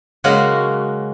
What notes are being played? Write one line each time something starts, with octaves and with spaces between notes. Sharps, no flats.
C#3 F#3 G#3 A#3 C#4 F#4